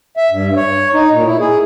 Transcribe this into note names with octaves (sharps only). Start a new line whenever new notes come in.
E5
G2
C#5
D#4
A#2
E4
G#4